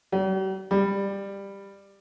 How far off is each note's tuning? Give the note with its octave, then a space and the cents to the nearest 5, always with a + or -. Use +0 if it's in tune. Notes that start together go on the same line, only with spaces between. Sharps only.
G3 -45
G3 +15